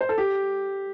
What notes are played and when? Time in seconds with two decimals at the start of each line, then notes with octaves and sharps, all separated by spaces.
0.01 C5
0.09 A4
0.18 G4